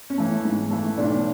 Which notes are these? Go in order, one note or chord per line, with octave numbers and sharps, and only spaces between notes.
C#4
E3 A3
G#2
E3 A3
B1 D4